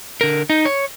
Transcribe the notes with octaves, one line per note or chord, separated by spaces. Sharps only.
D3 A#4
D#4
C#5